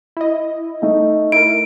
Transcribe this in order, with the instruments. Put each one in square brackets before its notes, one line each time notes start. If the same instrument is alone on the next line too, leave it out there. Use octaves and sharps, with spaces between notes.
[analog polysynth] E4 D#5
[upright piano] A3 D#4
[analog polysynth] E4 A#4 [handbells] D7